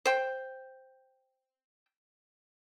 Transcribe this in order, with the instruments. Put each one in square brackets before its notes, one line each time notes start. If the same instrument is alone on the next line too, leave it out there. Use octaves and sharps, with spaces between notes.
[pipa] C5 G5